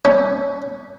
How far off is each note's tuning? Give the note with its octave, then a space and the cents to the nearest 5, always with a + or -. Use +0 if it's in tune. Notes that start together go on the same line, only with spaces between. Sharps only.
C#4 +15